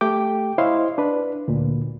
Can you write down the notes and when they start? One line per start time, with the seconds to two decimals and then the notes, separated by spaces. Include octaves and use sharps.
0.01 A3 G4 G5 D6
0.58 E4 C5 C#5 D#5 F5 C6
0.98 D4 B4
1.48 D2 A#2